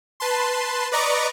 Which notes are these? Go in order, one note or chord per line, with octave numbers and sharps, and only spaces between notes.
B4 A5 C6
B4 D5 D#5 A#5 C#6 D6